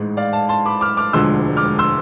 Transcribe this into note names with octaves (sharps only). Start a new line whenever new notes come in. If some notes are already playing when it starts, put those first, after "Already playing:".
Already playing: A1 G#2 G#3
D5 F5
F5 A5
A5 C6
B5 D6
D6 F6
D6 F6
E1 D2 D3 F3 G#3 C6 E6
D6 F6
C6 E6